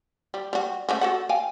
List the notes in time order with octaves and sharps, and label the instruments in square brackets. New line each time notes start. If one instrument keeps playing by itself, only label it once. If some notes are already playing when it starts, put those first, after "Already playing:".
[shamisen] G3
G3 F#4
A3 C#4 F#4
F#4 A4 F#5
F5 G5 G#5